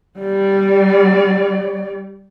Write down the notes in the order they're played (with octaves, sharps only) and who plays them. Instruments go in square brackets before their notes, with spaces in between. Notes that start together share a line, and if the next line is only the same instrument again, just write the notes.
[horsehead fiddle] G3 D5